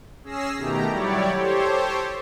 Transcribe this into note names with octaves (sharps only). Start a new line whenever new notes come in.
C#4 G#4 E6 A#6 C7
B2 D#3 A3 G4 A#5
F#3 G3 E4 G4 C#5 D5
G4 A4 C5 C#5